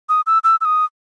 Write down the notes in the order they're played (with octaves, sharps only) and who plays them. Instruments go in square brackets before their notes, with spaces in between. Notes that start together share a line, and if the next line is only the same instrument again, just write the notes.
[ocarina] D#6
E6
E6
E6
D#6